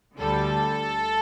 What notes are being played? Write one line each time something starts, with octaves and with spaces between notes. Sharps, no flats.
D2 D3 G3 A4